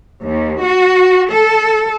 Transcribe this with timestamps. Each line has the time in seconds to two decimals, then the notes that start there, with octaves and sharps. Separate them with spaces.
0.24 D#2
0.63 F#4
1.32 A4